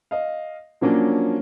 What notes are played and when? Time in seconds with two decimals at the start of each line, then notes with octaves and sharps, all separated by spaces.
0.11 D#5 F5
0.81 F3 F#3 A#3 C#4 D4